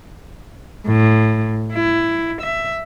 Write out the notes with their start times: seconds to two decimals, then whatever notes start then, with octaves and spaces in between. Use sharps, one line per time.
0.87 A2
1.73 E4
2.41 E5